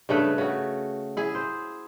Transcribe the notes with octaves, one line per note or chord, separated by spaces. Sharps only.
G2 C#3 A3 B4
C#3 F#4
E4 G#4
C5